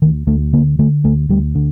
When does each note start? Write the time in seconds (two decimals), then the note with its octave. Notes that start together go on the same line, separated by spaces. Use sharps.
0.02 D2 D#3
0.27 D2 A3
0.53 D3 A#3
0.79 D3 A3
1.04 D2 A3
1.29 D2 G3
1.55 D3